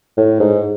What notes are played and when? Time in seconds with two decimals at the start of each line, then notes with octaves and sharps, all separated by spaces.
0.17 A2
0.40 G#2